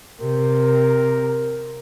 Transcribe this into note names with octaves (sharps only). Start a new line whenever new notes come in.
C3 A#4